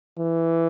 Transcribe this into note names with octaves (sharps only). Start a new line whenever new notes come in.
E3